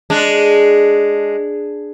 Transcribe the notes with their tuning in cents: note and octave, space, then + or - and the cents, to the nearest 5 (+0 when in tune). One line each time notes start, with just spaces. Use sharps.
G#3 +0 D4 +0